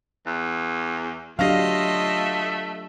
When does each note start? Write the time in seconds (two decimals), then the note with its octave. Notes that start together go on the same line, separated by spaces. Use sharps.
0.26 E2
1.39 F#3 A3 D4 F4 G4 D#5 F5 A#6